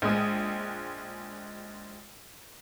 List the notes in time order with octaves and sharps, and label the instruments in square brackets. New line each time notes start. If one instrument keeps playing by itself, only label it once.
[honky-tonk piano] A#1 G#3 D#6